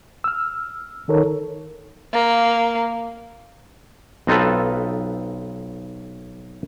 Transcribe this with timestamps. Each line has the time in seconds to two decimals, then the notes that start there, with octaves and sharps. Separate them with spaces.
0.24 E6 F6
1.08 D#3 D#4 A4 A#4 C#5
2.13 A#3
4.27 B1 C4 D#4 F4 A4 B4